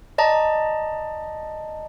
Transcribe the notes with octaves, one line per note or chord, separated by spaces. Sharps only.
D5 D#5 A5 A#5